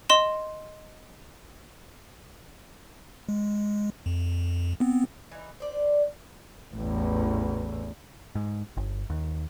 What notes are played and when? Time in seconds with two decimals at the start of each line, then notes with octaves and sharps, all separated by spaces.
0.09 D#5 C6 E7
3.29 G#3
4.06 F2
4.80 B3 C4
5.31 E3 D#4
5.60 C5 D5
6.75 A1 E2
8.35 G#2
8.77 G1
9.10 D#2